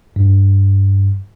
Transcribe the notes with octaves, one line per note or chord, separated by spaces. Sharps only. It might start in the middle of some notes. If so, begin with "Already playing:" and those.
G2